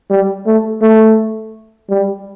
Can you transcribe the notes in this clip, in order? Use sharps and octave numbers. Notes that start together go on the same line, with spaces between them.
G3
A3
A3
G3